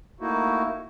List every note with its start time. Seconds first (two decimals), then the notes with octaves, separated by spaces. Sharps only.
0.20 A3 A#3 D#4 E4 F#4